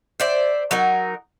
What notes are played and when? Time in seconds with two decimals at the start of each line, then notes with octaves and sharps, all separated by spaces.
0.20 C5 D5 E5
0.71 F#3 D#4 A#4